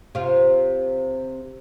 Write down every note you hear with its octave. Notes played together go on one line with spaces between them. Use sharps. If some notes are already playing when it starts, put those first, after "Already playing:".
C3 F4